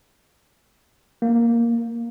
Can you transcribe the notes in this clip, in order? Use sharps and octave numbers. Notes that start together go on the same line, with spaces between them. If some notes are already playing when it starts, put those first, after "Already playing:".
A#3